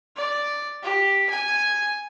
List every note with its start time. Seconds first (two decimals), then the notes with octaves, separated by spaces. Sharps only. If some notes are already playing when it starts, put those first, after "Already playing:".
0.17 D5
0.83 G4
1.30 G#5